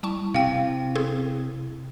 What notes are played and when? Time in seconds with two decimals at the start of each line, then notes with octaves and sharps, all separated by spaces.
0.03 G3 E4 A5 C#6
0.34 C3 F5 G5
0.95 C4 G#4 A4